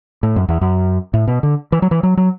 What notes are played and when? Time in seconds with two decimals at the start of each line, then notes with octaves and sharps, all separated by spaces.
0.23 A2
0.36 F#2
0.49 E2
0.61 F#2
1.14 A2
1.27 B2
1.43 D3
1.72 E3
1.82 F#3
1.91 E3
2.03 F#3
2.17 F#3